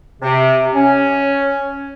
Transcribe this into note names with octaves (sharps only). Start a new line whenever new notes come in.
C3
C#4